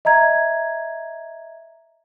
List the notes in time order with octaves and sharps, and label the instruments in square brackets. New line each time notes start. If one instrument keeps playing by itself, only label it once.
[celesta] D#5 E5 A#5 G#6